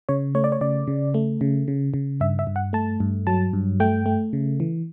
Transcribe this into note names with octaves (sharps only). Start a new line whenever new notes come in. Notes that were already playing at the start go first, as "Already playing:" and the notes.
C#3 C#5
A3 C#5
D5
C#5
C#3 D5
C#3
A3
C#3
C#3
C#3
G2 E5
E5
G2
F#5
A3 A5
G2
F#3 A5
G2
A3 G5
A3
C#3
E3